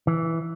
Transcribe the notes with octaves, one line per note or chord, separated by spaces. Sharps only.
E3